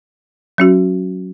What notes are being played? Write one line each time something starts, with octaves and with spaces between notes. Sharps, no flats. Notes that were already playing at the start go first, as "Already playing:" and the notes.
F#3 C#4 F#4